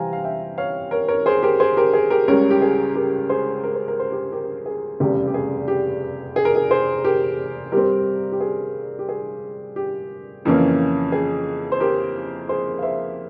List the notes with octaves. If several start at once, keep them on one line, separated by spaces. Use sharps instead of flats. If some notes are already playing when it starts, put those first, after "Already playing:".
Already playing: C3 E3 G3 C4 F5 G5 G#5 A#5
F5
E5 G5
C#5 F5
A#4 C#5
A#4 C#5
G#4 C5
G4 A#4
G#4 C5
G4 A#4
G#4
G4 A#4
C#2 C#3 G3 A#4 C#5
G4
G#4
G4 A#4
G#4 C5
A#4
C5
A#4
C5
G4 A#4
G4 A#4
G#4
F1 E2 C#3 G3 G4
G4
G#4
G4
G#4
A#4
G#4
G#4 C5
G4 A#4
G2 G3 C4 G4 A#4
G4
G#4
G4
G#4
G4
F2 C#3 E3 A#3 C#4
G#4
C5
G4 A#4
G#4 C5
F5
C5 E5